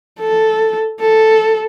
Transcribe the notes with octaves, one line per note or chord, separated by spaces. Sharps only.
A4
A4